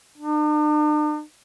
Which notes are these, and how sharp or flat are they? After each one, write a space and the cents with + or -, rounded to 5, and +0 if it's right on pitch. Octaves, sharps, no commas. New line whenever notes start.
D4 +45